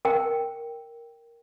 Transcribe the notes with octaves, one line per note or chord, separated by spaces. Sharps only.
A#4 G5